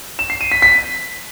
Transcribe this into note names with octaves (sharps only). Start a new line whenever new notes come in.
E7
C7
D#7
B6
B6